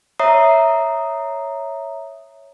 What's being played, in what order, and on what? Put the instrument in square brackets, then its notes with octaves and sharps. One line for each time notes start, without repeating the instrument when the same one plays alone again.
[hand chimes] C#5 E5 A#5 D#6 C7